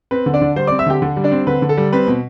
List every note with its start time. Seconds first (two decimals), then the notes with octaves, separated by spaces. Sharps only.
0.11 C4 B4
0.26 D3
0.34 D4 D5
0.42 D3
0.56 G3 C5 C6
0.67 D5 D6
0.71 C4
0.79 E5 E6
0.86 D3 G4 G5
1.02 D3
1.16 G3
1.24 D4 D5
1.32 C4
1.47 D3 B4
1.62 D3
1.69 A4
1.77 G3
1.93 C4 B4
2.07 B2